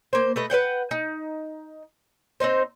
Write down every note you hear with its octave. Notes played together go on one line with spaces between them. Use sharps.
A#3 C5
A3 B4 D#5
B4 C5 F#5 G5
D#4
C4 C#4 D#4 C5